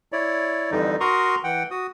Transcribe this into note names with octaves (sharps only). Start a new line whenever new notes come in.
E4 C#5 D5
F2 D3 E3 G3 D#4
F#4 A#4 A#5 C6 C#6 D#6
E3 F#5 G5
F#4 D#6